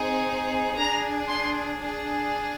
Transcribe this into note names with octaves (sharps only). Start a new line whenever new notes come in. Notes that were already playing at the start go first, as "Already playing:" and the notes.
Already playing: C4 D#4 G#4
D4 G#4 A#5
C6
D4 G#4